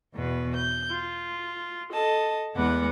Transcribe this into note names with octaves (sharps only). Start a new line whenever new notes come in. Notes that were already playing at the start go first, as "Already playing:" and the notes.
E2 B2 B4
G6
F4
A4 D#5 A5
E2 G#3 B3 B4 F#5 D6